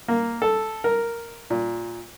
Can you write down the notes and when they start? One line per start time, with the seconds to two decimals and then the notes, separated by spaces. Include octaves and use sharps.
0.08 A#3
0.42 A4
0.84 A#4
1.50 A#2